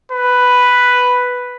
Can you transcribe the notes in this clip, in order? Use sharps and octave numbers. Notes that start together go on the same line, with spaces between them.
B4